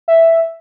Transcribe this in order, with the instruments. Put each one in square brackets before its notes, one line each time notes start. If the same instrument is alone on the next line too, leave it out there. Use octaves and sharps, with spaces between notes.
[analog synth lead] E5